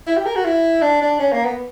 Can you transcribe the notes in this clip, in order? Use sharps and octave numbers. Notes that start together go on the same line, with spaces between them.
E4
G4
A#4
F#4
E4
D4
D4
C#4
A#3
B3